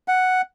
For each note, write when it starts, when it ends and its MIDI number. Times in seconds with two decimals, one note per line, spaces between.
0.08 0.42 78